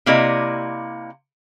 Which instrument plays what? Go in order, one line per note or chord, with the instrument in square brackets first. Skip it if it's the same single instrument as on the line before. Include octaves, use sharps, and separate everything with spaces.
[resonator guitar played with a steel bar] C3 A#3 E4 D5 D#5